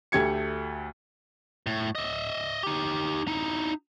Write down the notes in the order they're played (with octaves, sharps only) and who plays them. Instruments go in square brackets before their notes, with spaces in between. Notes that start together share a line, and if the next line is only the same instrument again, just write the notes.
[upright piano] D2 A3 G4 G#6 C#7
[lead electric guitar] A2
D#5 E5
D#4 G4
D#4 E4